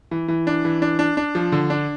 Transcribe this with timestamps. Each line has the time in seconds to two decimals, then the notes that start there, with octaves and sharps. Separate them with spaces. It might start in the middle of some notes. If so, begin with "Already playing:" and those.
0.11 E3
0.28 E3
0.47 D4
0.65 E3
0.82 D4
0.99 D4
1.17 D4
1.35 F3
1.52 D3
1.70 D4